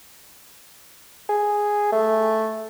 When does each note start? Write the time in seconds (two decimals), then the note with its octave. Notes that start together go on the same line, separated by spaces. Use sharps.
1.29 G#4
1.92 A3